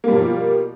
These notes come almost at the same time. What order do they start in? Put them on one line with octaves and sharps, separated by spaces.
A#3 G3 B2 F3